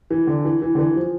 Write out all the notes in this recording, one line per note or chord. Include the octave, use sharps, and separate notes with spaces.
E3
D3
E3
E3
D3
E3
F3